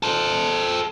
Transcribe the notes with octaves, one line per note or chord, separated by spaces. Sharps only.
A4 C5